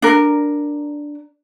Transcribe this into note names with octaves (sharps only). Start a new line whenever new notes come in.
D4 A#4